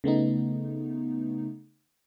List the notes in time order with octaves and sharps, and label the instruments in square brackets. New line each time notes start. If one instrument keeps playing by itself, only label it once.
[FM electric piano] C#3 A3 B3 D#4